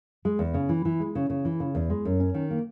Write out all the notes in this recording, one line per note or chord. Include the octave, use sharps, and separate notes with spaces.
G#3
E2
C#3
E3
E3
G#3
C#3
C#3
E3
C#3
E2
G#3
F#2
C#4
D#3
A#3